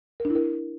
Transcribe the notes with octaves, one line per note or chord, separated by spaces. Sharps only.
A#4
D4
E4
A#4